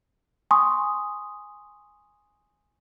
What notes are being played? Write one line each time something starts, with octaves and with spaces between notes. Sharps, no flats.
G#5 C6 C#6 D#6